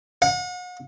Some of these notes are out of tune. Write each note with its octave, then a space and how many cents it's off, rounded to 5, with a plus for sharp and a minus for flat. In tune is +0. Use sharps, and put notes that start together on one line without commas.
F#5 -40